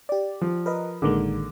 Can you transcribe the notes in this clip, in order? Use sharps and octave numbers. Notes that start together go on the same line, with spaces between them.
G4 D5
F3
A#4 B4 D#5
A1 D3 D#3 G#3 A#3